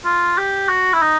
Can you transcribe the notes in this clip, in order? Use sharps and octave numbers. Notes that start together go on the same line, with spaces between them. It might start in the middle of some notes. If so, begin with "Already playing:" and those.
F4
G4
F#4
E4
D#4